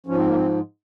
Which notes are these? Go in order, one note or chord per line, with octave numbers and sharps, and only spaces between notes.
G#2 F3 C#4
C4
A#3
C4